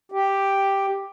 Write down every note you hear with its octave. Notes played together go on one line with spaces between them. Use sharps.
G4